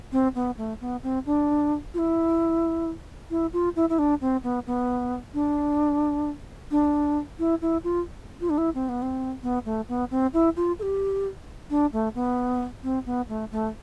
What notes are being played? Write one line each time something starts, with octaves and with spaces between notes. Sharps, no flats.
C4
B3
A3
B3
C4
D4
F4
E4
E4
F4
E4
E4
D4
C4
B3
B3
D4
D4
E4
E4
F4
F4
D4
E4
C4
B3
C4
B3
A3
B3
C4
E4
F4
A4
G4
D4
A3
B3
C4
B3
A3
A3